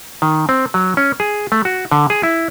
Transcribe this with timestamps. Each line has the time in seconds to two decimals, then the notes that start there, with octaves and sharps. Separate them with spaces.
0.22 D#3
0.49 C4
0.74 F#3
0.97 C#4
1.20 G#4
1.52 A3
1.65 F#4
1.92 D3
2.10 G#4
2.23 E4